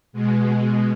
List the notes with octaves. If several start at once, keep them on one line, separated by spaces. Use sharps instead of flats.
B2 G#3